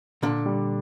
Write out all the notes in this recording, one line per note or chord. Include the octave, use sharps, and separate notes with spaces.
A#2 D3 D4
G3